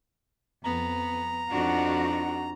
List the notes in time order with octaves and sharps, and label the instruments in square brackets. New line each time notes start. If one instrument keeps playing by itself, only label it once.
[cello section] F2 [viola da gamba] B3 [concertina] A#5
[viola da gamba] F2 D4 [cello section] D#4 F4 F#4